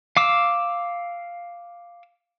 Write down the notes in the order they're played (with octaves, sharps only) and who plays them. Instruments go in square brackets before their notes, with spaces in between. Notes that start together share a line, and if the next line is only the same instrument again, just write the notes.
[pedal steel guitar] F5 D6 E6